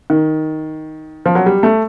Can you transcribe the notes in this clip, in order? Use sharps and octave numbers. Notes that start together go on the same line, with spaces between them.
D#3
F3
F#3
G3
A3